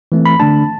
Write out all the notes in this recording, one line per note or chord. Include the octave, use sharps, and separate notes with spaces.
E3 A3 C4
B5
D3 A3 D4 A5